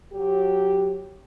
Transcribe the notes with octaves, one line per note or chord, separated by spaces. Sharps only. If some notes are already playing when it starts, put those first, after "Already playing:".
F#3 G4